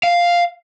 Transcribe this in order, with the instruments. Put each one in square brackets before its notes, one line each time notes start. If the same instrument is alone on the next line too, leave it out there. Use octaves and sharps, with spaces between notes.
[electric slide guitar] F5